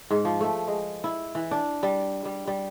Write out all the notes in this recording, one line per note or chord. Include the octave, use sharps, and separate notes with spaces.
G#2
F3
A3
G#3
E4
E3
D4
G3
G3
G3